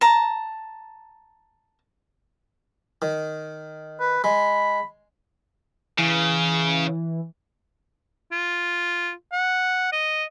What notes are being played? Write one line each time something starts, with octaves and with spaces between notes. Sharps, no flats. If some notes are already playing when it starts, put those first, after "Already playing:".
A5 A#5
D#3
B4
G#3 B5
C#3 E3
F4
F#5
D#5